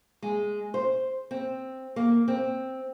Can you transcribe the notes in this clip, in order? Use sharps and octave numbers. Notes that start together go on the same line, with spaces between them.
G#3
C5
C4
A#3
C4